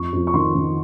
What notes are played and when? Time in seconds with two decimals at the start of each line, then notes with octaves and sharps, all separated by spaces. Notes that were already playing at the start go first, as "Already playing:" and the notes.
Already playing: F2 C#6
0.13 F2
0.27 C#6
0.34 D#3 C6
0.55 D#3